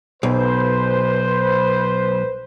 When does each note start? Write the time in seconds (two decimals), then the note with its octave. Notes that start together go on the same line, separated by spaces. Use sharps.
0.23 B1 B4 C5